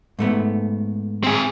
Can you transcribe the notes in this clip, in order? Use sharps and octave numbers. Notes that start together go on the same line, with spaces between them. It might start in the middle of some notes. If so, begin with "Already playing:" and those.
G#2 A3 B3
C4 G#4